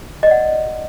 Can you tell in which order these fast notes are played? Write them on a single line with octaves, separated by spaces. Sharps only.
D#5 D5 F#5